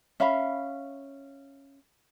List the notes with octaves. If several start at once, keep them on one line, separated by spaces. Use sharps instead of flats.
C#4 E5 F5 B5